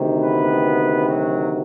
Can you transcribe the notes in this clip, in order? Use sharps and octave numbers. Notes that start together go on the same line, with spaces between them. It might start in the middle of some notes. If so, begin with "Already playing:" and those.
Already playing: D2 C3 D#3
B3 B4
F#3 F#4